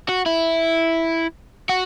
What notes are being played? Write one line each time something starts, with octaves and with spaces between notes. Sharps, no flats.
F#4
E4
F#4